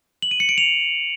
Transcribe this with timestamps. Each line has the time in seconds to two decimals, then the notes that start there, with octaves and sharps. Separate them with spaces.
0.22 F#7
0.31 D#7
0.40 C#7
0.49 D7
0.58 F7